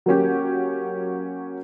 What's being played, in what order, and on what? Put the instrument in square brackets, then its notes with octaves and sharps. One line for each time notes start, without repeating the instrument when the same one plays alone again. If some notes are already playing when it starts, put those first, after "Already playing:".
[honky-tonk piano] F#3 A#3 C#4 G4